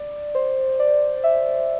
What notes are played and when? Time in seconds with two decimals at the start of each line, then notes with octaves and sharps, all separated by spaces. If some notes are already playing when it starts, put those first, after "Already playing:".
Already playing: D5
0.35 C5
0.79 D5
1.24 E5